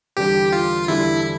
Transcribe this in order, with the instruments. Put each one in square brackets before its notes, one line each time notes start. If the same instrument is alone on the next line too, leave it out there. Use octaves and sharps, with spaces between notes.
[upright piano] E2 D3 G3 D4 [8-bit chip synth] G4
[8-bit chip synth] F4
[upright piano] E2 D3 G3 D4 [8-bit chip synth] E4